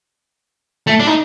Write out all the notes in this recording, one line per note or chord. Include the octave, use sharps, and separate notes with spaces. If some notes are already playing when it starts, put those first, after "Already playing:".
A3
D4
D#4